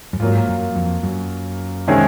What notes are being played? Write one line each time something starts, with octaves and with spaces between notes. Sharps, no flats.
F#2
G#2 F#3 A#3 F4
F#2
F2
F#2
C3 D#3 G#3 C#4 G#4